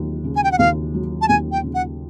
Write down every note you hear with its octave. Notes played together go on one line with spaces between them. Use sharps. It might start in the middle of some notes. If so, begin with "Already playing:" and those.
Already playing: D#2 F#3
C#3
G#5
G5
F#5
D#2 F5
F#3
A5
D#2 G#5
G5
C#3
F#5